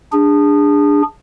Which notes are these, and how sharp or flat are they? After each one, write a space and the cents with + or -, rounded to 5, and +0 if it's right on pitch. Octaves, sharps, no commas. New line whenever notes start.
D4 +0 G#4 -25